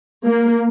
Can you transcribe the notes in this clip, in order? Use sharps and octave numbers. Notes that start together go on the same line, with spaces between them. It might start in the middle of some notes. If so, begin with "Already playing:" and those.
A#3